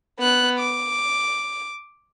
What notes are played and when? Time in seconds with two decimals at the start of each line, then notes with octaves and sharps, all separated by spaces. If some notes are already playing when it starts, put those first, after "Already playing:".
0.20 B3 F#6
0.60 D6